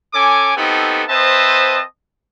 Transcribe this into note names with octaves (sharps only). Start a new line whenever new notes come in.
C#4 A4 G#5 D6
B3 C4 D#4 G4 A4
C4 B4 C5 D#5 E5 A5